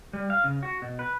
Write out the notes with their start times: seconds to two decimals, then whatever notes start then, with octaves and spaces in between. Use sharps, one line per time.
0.13 G3
0.30 F5
0.44 C#3
0.63 F#4
0.82 B2
0.99 B4